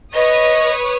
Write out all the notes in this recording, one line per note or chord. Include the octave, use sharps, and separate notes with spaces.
B4 C#5 D#5 D#6